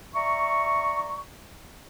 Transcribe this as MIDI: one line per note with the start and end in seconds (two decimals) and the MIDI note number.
0.15 1.21 74
0.15 1.21 76
0.15 1.21 82
0.15 1.21 85